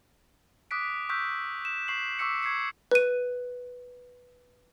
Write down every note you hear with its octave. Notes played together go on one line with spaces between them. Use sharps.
D6 D#6 F#6 B6 D7
C#6 E6 F#6 G6 B6
E7
C#6 C7 F#7
C#6 D6 E6 B6 C#7
C#6 G#6 C7 C#7
B4 D#7